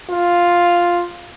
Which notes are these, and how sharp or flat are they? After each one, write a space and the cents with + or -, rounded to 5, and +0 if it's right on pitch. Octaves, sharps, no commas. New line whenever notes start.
F4 +0